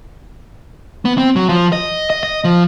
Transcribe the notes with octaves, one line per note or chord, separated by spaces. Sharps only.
B3
C4
F#3
F3
D#5
D#5
D#5
F3